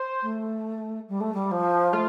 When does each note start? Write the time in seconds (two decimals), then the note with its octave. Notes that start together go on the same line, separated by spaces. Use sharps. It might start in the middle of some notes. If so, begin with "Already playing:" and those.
Already playing: C5
0.22 A3
1.08 G3
1.20 A3
1.34 G3
1.51 F3
1.93 A3 F4